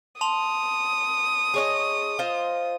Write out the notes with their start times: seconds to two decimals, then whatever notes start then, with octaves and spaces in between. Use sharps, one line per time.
0.21 A5 C6 D#6 F7
1.54 G#4 C#5 D#5
2.19 F4 C5 D#5